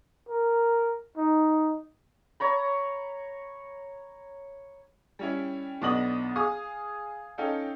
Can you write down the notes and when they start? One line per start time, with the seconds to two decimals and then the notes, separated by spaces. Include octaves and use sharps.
0.29 A#4
1.17 D#4
2.40 C#5 A#5 B5
5.19 G3 C#4 E4
5.82 B1 B3 D4 D#5 D#6 F#7
6.36 G#4 F5 D#6
7.38 C#4 D#4 A4 F5 G5